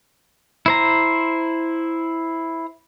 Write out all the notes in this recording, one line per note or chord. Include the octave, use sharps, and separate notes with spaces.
E4 C5 A#5